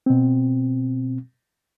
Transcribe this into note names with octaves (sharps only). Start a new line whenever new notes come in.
B2 C4